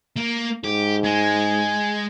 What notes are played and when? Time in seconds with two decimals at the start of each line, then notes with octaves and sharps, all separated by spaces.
0.17 A#3
0.64 G#2 G4
1.05 G#3 G#5